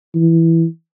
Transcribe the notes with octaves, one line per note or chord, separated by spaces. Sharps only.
E3